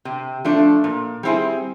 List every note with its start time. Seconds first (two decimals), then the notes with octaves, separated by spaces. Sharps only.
0.05 C3
0.45 F3 A3 D4
0.84 A#2
1.23 G3 C4 E4 G#4